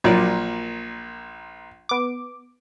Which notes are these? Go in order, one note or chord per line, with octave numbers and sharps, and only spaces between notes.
A#1 A#2 F#3 D5
B3 D6